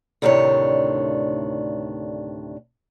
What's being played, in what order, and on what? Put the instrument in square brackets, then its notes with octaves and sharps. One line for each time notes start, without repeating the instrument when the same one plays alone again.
[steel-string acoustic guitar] D2 A2 C3 D#3 D4 C#5